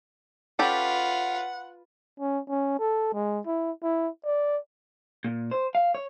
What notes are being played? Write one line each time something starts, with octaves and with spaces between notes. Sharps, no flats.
C#4 F4 G4 A4 B4 F#5
C#4
C#4
A4
G#3
E4
E4
D5
A#2
C5
F5
C#5